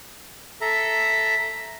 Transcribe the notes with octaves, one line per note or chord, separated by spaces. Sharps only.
A4 E5 A#5